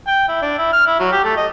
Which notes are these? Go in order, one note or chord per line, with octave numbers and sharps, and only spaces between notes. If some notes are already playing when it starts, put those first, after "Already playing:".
G5
E4
D4
E4
F6
E4
F#3
G4
A3
D#5